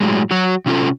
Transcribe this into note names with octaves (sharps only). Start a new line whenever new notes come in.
A2 F#3 G#3
F#3 F#4
C3 C#4 F4 A4